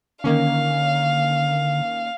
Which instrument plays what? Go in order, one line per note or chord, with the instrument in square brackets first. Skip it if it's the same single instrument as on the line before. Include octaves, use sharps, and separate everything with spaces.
[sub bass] D3 [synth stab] D#3 A#3 C#4 [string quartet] F5